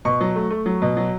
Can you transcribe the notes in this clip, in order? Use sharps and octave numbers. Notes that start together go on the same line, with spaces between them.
B2 C#6
F#3
A3
A3
F#3
B2
F#3